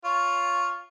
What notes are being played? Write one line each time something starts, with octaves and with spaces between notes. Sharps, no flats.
F4 C#5